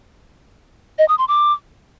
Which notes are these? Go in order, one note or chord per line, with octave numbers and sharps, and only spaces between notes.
D#5
D#6
C6
D6